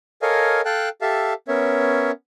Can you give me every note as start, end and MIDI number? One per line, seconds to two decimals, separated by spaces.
0.22 0.61 69
0.22 0.61 70
0.22 0.61 73
0.22 0.61 75
0.22 0.61 77
0.22 0.61 80
0.65 0.89 69
0.65 0.89 77
0.65 0.89 79
0.65 0.89 81
0.65 0.89 90
1.02 1.34 67
1.02 1.34 69
1.02 1.34 76
1.02 1.34 77
1.02 1.34 81
1.48 2.11 59
1.48 2.11 61
1.48 2.11 70
1.48 2.11 73
1.48 2.11 76